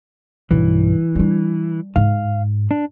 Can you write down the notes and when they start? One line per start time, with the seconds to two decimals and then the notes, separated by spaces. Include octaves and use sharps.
0.51 B1 G2 E3
1.16 G3 D4
1.96 G#2 F5
2.71 D4